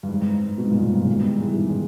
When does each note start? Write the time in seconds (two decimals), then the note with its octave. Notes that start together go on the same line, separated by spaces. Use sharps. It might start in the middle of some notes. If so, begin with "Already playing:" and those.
0.03 G2
0.09 G#2
0.22 G#2
0.34 G#2
0.58 G#2 B2
0.70 G2 A#2
0.83 G#2
0.95 G2 A#2
1.03 C#3
1.08 G#2 B2
1.24 D#3 G3
1.40 E3 G#3
1.57 D#3 G3
1.69 C#3 E3